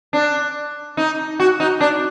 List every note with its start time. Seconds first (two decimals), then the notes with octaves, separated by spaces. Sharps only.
0.13 D4
0.97 D#4
1.40 F#4
1.60 D#4
1.81 D4